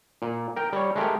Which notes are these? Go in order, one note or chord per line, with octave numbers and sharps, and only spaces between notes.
A#2
A#4 G5
G3 C#5
G#3 A3 G4 A#4